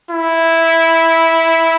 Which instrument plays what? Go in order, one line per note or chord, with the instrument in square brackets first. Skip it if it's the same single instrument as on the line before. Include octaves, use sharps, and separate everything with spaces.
[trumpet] E4